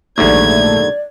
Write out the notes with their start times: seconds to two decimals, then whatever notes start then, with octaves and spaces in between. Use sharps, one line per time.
0.18 A#1 D#2 G#2 D3 A3 D5 G#6